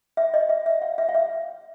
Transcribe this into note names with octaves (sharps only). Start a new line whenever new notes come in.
E5
D#5
E5
E5
F5
E5
F5
E5